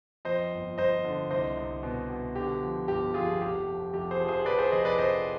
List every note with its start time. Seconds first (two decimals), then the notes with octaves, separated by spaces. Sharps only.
0.25 F2 C5 D#5
0.52 G1
0.78 G1 C5 D#5
1.05 D3
1.31 C2 C5 D#5
1.57 C2
1.83 B2
2.10 B2
2.35 D3 G4
2.62 F3
2.88 G1 G4
3.14 F2 F4 G#4
3.41 F1 G4
3.67 F3
3.93 F1 G4
4.11 G#4 C5
4.20 F3
4.28 G#4 C5
4.46 F1 B4 D5
4.59 G#4 C5
4.72 F1 C5 D#5
4.85 B4 D5
4.98 F1 C5 D#5